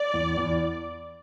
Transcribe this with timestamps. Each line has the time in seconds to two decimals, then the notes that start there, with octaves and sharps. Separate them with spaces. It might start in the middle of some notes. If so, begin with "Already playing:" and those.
Already playing: D5
0.13 E2
0.37 E2